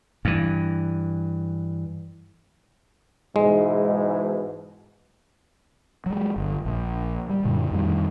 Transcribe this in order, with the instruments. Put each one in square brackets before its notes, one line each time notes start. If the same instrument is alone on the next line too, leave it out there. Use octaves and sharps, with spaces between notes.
[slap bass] G2 E3
[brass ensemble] G#2 B2 E3 [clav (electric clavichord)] G#3
[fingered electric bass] F#3 G#3
G1
A#1
G3
F#2 A#2 D3
F2 D#3 G3